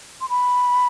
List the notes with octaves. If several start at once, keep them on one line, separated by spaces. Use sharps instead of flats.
C6
B5